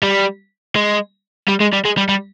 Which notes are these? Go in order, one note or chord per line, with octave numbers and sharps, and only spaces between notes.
G3
G#3
G3
G#3
G3
G#3
G3
G3